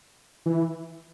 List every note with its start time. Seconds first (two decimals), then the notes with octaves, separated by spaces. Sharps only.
0.46 E3